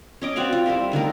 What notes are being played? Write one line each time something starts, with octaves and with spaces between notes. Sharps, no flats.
C#4 D#5 D6
C4 F#4 D5 F5
F4
G3 E4 A#4 E5
D3 D#3 A3 A#4